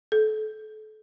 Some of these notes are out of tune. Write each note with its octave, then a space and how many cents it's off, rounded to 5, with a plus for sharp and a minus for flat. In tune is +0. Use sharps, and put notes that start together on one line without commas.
A4 -35